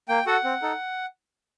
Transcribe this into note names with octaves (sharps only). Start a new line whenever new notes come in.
A#3 G5
F#4 A4 F#5
C4
D#4 A4